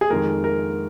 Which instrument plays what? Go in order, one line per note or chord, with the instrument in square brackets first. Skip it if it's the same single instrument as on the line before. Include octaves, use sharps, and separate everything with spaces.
[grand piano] G#4
[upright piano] F2 D#3 G#3 [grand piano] A#4
[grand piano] A#4